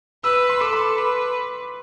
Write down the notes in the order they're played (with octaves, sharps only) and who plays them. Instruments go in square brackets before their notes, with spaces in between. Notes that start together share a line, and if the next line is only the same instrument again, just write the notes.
[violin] B4 [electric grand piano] E6
[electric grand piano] C6
[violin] A4 [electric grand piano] D6
[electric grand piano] B5
[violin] B4